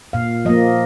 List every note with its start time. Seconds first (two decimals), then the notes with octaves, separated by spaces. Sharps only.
0.13 A#2 F5
0.45 F3 A#3 D#5